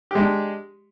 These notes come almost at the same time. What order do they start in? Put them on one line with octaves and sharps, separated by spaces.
G4 G#3 D4